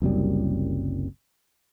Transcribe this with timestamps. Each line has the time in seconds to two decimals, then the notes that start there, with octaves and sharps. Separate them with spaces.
0.02 F#1 C2 F#2 G3